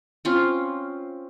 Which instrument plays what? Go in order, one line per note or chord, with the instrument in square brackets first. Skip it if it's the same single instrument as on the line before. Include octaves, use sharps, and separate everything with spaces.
[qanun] C4 C#4 F4